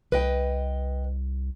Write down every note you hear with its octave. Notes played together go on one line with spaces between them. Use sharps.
C2 B4 D#5 G5